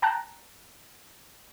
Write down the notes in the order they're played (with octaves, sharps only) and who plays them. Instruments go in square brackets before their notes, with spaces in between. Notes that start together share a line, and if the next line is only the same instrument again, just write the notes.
[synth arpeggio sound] G5 A5 A#5 F#6